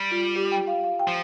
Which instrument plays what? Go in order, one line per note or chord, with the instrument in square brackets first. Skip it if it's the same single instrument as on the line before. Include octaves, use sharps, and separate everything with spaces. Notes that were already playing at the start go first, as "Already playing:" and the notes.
Already playing: [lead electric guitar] G3
[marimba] F4
G4
G5
F5
F5
G5
[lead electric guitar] F3